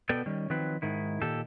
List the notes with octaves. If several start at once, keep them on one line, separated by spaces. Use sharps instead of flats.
B2 B3 A4 D5 G5
D#3 G3 C#4
D#3 F3 F#3 C4 B4
G#2 D#3 E4
A#2 D#3 G4 A4